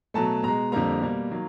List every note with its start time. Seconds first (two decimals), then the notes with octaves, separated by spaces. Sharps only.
0.14 B2 F#3 A3 A5
0.43 B2 G#3 A#5
0.72 F2 D3 G3 A#3 A#5
1.01 B2 G3 A#3
1.31 D#3 F#3 A#3